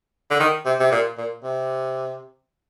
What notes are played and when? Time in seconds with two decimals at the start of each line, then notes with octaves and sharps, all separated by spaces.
0.31 D3
0.40 D#3
0.65 C3
0.80 C3
0.92 A#2
1.18 A#2
1.43 C3